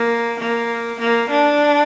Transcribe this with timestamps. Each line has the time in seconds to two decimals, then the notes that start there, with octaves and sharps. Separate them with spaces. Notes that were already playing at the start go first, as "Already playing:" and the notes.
Already playing: A#3
0.39 A#3
1.00 A#3
1.30 D4